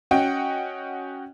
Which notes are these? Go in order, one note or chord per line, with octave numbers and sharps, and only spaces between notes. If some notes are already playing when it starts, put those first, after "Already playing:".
C#4 F#4 D#5 F#5 G5